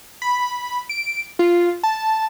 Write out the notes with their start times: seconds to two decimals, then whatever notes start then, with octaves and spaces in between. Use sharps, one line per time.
0.22 B5
0.89 D7
1.39 F4
1.83 A5